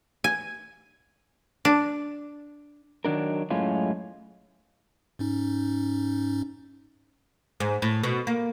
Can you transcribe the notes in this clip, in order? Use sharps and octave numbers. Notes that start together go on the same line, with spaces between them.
G#5
D4
D#3 F#3 D4 A#4
F#2 A2 G#3 C#4 F4
G#2 C#4 D#4
G#2
A2
B2
A#3